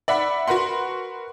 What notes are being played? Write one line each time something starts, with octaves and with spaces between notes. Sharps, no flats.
D5 E5 F#5 B5
F#4 A#4 B4 F#5 C6